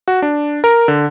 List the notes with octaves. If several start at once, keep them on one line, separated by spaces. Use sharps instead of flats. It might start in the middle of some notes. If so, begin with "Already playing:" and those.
F#4
D4
A#4
D3